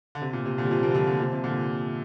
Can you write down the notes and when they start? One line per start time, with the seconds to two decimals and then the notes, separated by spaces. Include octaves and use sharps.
0.15 D3
0.21 C3
0.33 A#2
0.45 C3
0.58 A#2 D3
0.65 G3
0.70 C3 F3
0.83 F3 A#3
0.91 D3
0.94 C3 F3
1.07 A#2 D3
1.19 C3 F3
1.33 C3
1.44 A#2 D3